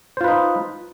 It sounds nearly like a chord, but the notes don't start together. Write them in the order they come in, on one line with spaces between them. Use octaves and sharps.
C5 F4 B4 D#4